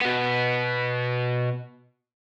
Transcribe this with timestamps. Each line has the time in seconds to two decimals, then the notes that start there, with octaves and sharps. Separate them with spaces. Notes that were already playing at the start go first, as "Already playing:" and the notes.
0.02 B2 B3